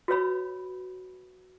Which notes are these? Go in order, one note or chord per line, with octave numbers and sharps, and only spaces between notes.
F#4 B4 C#5 B5